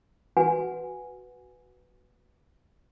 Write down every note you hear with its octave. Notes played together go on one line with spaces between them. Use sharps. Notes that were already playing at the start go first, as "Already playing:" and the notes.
F#4 B4 F#5 G#5